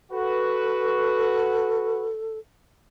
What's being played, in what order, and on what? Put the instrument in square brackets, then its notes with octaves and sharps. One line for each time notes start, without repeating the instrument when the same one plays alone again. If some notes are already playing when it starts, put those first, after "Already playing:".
[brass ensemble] F#4 B4 [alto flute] A4